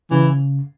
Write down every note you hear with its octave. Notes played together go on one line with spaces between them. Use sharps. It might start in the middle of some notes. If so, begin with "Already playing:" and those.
C#3 E3